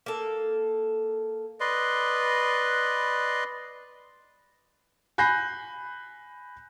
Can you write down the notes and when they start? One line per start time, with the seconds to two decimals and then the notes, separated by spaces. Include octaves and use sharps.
0.06 A#3 A4
1.60 B4 D5 D#5 C6
5.18 G#5 B5 F#6 G6 A#6 C7